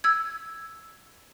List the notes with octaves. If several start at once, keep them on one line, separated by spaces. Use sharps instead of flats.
E6 G#6